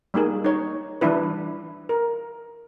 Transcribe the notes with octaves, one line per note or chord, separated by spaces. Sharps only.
G3 A#3 D#4 G#4
D#4 C#5
E3 G3 D4 E4 B4
A#4